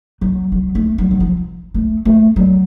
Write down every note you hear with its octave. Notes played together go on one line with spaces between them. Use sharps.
F#3
F#3
A3
F#3
D#3
F3
A3
A3
F#3